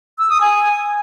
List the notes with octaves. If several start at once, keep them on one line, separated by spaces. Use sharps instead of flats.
E6
D#6
G#5